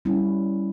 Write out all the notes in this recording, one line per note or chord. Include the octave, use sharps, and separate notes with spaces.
G3 C#4 E4